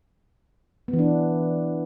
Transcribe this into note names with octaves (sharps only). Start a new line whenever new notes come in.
B3
E3
D4